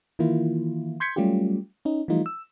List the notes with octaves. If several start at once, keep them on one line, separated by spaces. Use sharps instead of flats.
D#3 E3 A#3 E4 F4
C6 G6 G#6 B6 C#7
F#3 G3 A3 C#4 F4 G4
C#4 D#4
E3 F3 G3 A3 D#4 F4
E6